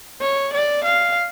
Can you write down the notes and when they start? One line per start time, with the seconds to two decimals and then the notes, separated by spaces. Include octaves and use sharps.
0.21 C#5
0.52 D5
0.83 F5